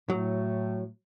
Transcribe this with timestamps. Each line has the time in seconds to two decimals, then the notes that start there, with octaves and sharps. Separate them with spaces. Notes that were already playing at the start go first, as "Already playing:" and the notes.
0.10 A2 F#3 A3